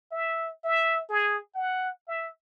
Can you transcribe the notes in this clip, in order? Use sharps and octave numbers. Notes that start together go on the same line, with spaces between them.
E5
E5
G#4
F#5
E5